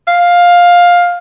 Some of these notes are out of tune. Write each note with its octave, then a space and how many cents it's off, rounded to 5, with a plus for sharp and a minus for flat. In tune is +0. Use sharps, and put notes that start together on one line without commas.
F5 +10